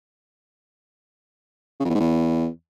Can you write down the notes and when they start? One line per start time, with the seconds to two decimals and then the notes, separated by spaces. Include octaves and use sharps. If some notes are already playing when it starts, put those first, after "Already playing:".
1.80 C#3
1.85 F2
1.90 E2
1.95 G#2
2.00 E2